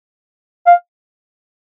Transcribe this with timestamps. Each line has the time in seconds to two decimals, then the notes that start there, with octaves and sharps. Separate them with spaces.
0.66 F5